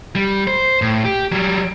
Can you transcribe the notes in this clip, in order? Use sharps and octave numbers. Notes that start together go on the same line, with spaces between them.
G3
C5
A2
G4
F#3 G3